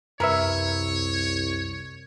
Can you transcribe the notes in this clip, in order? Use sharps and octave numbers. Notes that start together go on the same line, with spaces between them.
C2 F#2 A#4 B4 C#5 E5